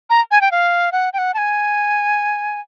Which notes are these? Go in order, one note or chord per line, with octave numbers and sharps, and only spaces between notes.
A#5
G#5
G5
F5
F#5
G5
F#5
A5
G#5